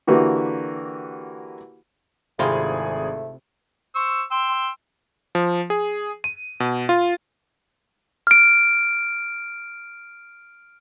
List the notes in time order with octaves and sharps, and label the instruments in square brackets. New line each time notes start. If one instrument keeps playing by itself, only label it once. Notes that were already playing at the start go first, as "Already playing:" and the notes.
[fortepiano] D3 E3 A#3 F#4 G4
[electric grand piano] G#1 G#4 [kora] C3 E4 F4 [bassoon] A3
[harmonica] C5 C#6 E6
G5 C6 E6
[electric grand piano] F3
G#4
D#7
B2
F4
[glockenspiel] F6 D7